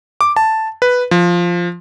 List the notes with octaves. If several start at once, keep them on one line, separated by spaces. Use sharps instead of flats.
D6
A5
B4
F3